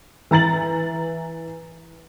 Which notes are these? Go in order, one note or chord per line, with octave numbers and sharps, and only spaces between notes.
E3 A#5 A6 F#7